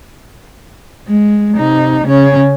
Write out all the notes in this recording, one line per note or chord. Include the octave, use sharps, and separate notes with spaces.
G#3
C3 D#4
C#3 C#4